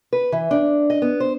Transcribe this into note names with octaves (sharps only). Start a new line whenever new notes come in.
B4
E3
D4
D#5
B3
C5